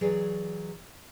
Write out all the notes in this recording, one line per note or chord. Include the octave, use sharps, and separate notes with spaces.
E3 F#3 G#4 C#5 D5